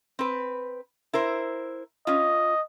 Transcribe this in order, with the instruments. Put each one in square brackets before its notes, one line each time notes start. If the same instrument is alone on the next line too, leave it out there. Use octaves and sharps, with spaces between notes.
[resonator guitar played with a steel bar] C4 B4
E4 A#4 C5
[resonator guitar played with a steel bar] C#4 F4 [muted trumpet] D#5